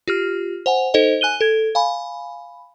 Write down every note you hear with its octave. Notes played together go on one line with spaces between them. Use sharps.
F4 G4 F6
C5 F#5 G#5
D#4 A4 C5 D#5
G#5 F#6 D#7 G7
A4 G#6
F5 G#5 B5